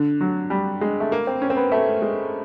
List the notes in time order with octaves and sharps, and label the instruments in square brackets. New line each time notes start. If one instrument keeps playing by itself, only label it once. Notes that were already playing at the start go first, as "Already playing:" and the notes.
Already playing: [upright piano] D3
F#3
G3
G#3
A3
A#3
C4
C#4
C4
B3
A3
G#3